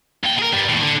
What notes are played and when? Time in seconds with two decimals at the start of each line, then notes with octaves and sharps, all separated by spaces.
0.24 A#2 G5
0.39 G#4 A#4
0.53 G2 G3
0.69 D#2 A2
0.82 D3